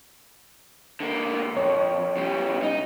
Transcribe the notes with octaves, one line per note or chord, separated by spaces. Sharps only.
D3 A#3
F2 C#5
C#3 G3
D#4